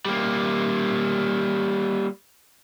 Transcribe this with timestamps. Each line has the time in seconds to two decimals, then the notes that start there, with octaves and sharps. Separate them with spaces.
0.05 G3 A#3